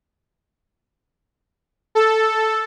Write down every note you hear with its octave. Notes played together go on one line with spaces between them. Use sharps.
A4